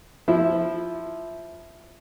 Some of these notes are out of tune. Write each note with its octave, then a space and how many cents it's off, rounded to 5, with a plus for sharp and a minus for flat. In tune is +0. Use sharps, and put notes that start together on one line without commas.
F3 +0 E4 +0